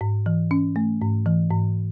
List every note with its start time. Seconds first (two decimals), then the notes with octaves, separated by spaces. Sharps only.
0.01 G#2
0.26 E3
0.51 C#4
0.76 A3
1.01 G#2
1.26 E3
1.50 G#2